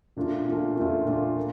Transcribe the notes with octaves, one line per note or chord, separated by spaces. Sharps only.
A#2 A3 D4 F4
A#2 A3 D4 F4
A#2 A3 D4 F4
A#2 A3 D4 F4
A#3